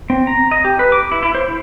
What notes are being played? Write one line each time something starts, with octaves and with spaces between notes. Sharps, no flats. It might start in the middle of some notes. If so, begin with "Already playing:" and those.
C4
A#5
D#5
G4
B4
D6
E4
E4
C5
E4